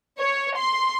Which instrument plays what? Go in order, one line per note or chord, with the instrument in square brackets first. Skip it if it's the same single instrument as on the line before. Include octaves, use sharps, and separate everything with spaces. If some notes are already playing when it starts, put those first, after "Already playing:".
[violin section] C#5
C6